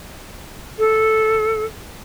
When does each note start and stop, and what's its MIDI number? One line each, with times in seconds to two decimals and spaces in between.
0.79 1.65 69